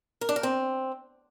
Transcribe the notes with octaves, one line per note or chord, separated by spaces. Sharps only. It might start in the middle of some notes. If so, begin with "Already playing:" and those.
A#4
D4
A#4
C4